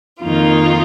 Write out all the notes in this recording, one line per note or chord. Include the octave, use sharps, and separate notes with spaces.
F2 D#3 A#3 D#4 F4